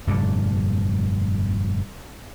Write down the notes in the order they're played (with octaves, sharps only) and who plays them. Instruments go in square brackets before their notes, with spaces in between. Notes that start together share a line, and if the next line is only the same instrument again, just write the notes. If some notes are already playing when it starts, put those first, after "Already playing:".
[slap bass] F1 G2 A#2 D3